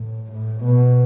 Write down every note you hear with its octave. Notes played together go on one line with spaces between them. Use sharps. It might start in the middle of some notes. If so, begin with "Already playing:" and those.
Already playing: A2
A2
B2